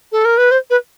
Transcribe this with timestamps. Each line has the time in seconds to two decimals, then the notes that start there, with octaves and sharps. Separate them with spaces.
0.12 A4
0.25 A#4
0.38 B4
0.51 C5
0.70 B4